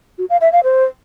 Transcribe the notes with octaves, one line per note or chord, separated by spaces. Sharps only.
F#4
F5
E5
F5
C5